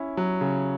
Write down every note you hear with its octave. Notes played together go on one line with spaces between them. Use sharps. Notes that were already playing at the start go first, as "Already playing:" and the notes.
Already playing: C#4 E4
F#3
C#3